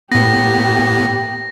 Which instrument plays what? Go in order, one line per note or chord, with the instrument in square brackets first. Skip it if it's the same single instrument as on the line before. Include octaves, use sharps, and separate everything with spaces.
[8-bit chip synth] A2 B3 [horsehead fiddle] A#3 G4 [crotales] A#6